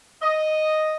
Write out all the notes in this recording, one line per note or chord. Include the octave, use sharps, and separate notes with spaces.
D#5